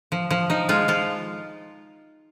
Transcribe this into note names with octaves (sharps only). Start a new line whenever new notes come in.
F3
F3
F3 D#4
G#3 F4
F3 F4